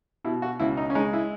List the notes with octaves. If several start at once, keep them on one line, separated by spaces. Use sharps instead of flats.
B2 E4
F#4
C#2 E4
D#4
C#4
G#3 D#4
E4